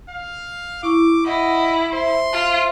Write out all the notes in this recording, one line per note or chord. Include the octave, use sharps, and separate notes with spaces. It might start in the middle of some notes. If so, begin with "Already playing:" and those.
F5
E4 C#6 D6
E4 D#5 F#5
C5 E5 C6
F4